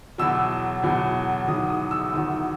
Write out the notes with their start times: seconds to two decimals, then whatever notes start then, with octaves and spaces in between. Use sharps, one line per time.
0.18 E2 B2 F#3 E6
0.83 E2 B2 F#3
1.48 E2 D#3 F#3 D#6
1.69 D#6
1.91 E6
2.12 E2 D#3 F#3 D#6